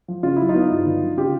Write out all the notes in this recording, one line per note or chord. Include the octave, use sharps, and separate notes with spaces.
F3
C#3 F4
F#3 E4
D#4 F4
B3
G2
D3
F3
C#3 F4 G4